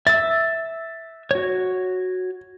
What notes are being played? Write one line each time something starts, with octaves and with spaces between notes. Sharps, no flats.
E5 E6 A6
F#4 C#5